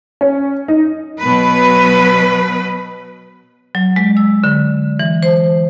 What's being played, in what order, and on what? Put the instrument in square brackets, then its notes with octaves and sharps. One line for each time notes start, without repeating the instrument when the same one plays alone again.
[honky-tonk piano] C#4
D#4
[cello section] B2 F#3 B4
[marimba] F#3
G#3
E6
D3
E3
C5